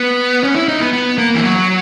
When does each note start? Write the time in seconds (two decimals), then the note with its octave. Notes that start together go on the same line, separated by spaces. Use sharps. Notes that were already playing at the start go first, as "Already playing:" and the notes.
Already playing: B3
0.44 C#4
0.56 E4
0.68 D#4
0.80 B3
0.93 B3
1.18 A#3
1.35 E3
1.43 F#3